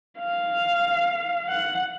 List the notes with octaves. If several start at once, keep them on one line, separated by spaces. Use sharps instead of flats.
F5
F#5